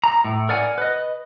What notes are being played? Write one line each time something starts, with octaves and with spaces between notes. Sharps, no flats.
A#5
A2
A#4 D5 F#5 G#5
B4 D#5